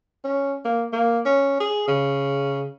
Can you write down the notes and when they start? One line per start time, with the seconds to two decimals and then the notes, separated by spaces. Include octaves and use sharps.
0.24 C#4
0.65 A#3
0.93 A#3
1.25 C#4
1.60 G#4
1.88 C#3